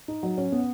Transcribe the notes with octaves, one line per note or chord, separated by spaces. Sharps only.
D#4
F#3
C#4
B3